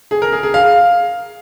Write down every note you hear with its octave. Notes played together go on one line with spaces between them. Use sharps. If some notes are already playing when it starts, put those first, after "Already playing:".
G#4
A#4
G#4
G#4
F5